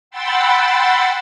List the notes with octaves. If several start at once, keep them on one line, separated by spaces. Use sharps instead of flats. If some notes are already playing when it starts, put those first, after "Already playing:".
F#5 G5 B5 C6 E6 A6